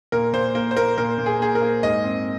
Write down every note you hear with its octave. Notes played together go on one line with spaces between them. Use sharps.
A#2 A#4
A#2 C5
A#3 A#4
C5
A#3 A#4
A#2 A#4
A#2
G#4
A#3 G#4
A#4
A#3
G#2 D#5
C4